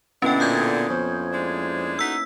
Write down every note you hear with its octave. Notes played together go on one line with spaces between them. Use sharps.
B2 D3 A#3 C#4 E4 G5
A#2 D#6 G6 G#6
F2 C#4 C5
G#3 D4
D#4 F#4 A4 E6 B6